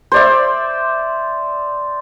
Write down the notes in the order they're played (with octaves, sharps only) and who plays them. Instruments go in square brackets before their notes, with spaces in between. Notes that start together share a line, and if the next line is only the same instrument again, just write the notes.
[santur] C5 D5 E5